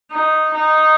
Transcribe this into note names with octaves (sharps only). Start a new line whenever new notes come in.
D#4
D#4